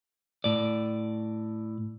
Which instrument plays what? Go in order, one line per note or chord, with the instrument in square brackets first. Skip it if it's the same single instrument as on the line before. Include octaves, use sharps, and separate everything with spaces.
[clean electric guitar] A2 D5